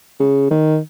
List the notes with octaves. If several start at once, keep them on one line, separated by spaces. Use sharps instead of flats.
C#3
D#3